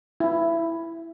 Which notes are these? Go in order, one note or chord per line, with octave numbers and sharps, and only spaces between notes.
E4